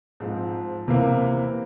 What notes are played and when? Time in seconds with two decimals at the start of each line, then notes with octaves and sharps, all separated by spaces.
0.20 G#2 F3 C4
0.88 C3 E3 A#3